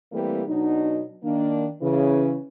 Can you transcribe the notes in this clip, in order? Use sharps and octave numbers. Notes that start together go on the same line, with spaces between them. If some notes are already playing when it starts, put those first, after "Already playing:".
E3 G3 A3 A#3 C4 G4
B2 F#3 D4 D#4
D#3 A#3 D4
C#3 E3